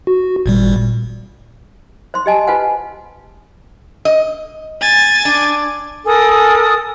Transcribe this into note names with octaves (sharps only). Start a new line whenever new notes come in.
F#4
G#1 A#2 G3
C5 C6
G4 D#5 G#5 A5
F4 B4 C5 F#5 G#5
D#5
G#5 A6
D4
A4 A#4 G#5 D#6